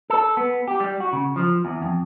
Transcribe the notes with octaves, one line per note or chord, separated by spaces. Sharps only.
A4
B3
G4
G3
F#4
C#3
F3
E2
F2